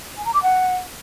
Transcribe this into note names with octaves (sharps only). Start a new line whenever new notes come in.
G#5
A#5
D6
F#5